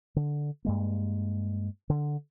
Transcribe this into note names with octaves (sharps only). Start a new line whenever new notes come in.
D3
G2 G#3 A#3
D3